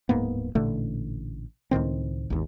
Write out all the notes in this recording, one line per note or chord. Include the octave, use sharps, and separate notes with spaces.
D1 G#2 A#3 B3
A1 A#2 D3 A3
C#2 A2 D#3 C4
G#1 D#2